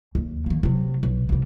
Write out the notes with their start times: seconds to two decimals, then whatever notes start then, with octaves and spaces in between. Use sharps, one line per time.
0.15 D#2
0.46 D#3 A#3
0.63 C3 F#3
1.03 B1
1.29 C2 G3